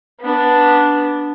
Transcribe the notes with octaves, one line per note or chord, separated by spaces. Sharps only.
B3 D4